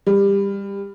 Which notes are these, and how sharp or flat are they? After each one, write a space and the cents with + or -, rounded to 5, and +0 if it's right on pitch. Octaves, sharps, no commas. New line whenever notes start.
G3 +25